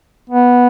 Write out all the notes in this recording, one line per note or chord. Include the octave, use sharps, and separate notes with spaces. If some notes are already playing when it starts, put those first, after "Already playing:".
B3